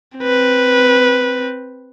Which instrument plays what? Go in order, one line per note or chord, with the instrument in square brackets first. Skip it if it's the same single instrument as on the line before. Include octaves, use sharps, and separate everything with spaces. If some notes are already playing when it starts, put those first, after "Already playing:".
[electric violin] C4 B4